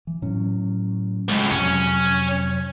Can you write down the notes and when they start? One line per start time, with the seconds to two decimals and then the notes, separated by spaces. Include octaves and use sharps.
0.07 E3
0.22 A2 F#3 C#4
1.29 C#2 A2 G#3
1.51 F2 C3 F#3 C#4